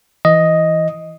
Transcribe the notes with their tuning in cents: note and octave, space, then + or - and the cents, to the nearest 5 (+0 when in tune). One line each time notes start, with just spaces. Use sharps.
E3 +0 D#5 +5